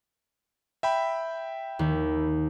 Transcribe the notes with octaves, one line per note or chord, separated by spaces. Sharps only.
E5 G5 B5
D#2